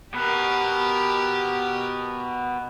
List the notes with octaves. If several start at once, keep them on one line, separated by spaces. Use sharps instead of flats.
B2 B3 G4 A#4